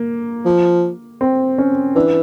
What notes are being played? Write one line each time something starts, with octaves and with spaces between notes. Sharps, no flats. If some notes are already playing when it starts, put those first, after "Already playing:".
Already playing: A#3
F3
C4
C#4
E3 D4